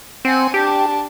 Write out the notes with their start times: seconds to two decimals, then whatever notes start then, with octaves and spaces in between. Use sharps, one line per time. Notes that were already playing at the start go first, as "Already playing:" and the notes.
0.25 C4 F#5 G#5
0.54 D4 G4 A5